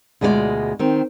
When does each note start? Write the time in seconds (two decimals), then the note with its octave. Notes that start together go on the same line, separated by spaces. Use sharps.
0.21 D2 B2 G#3 F4 A4 D5
0.79 D#3 C4